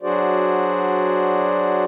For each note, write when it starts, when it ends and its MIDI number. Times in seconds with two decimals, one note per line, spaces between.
0.02 1.85 54
0.02 1.85 62
0.02 1.85 66
0.02 1.85 68
0.02 1.85 72
0.02 1.85 74